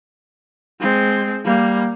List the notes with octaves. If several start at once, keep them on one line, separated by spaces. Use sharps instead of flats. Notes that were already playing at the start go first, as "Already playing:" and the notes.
G#3 C4
G3 A#3